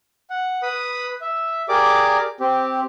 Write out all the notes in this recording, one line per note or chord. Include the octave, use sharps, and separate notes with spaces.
F#5
B4 B5 D#6
E5
G4 G#4 A#4 D5 D6
C4 G4